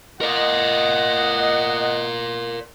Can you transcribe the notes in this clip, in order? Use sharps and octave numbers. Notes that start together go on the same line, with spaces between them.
A#4 D5 D#5 F#5